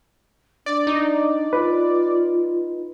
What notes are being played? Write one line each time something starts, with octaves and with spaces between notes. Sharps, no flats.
D4 D5
D#4
F4 B4